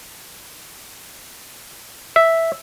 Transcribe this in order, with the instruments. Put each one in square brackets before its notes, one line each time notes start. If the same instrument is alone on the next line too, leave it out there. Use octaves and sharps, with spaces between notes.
[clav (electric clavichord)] E5